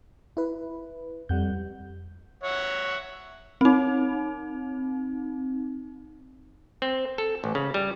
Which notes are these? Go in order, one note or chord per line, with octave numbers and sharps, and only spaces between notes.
E4 B4
F2 G3 F#5 G6
C#5 E5 F#5
C4 D#4
C4
A4
A1
C#3
G3